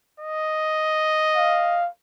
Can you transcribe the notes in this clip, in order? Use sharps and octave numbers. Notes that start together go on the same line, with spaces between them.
D#5
F5